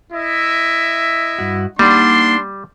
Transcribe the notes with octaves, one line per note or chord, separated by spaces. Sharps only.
E4 D#5 E5
G2 F#4
G3 A#3 D4 D#4 F#5 C6